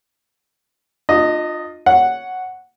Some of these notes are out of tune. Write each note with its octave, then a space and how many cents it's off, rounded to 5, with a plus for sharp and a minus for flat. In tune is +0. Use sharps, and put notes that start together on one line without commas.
D4 +45 F4 +15 D#5 +0
C#5 +0 F#5 +0